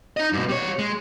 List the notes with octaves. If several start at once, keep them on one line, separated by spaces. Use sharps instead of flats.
D#4 D#5
G2 B2
G3 C#5
G#3